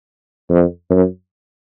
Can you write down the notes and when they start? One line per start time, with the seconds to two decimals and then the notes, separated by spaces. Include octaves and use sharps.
0.50 F2
0.90 F#2